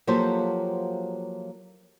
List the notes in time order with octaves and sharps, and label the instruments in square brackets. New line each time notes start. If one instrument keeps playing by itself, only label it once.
[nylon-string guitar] F3 F#3 A#3 G4 A4 C5